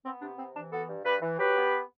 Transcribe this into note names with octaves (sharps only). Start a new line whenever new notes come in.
B3 C4
C3 D4
C3 C4
E3 D4
B3 F#4 A4
G2
G2 G4 B4
E3
F#3 G4 B4
B3